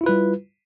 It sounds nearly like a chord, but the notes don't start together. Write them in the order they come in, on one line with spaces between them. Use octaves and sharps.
E4 F4 B4 G3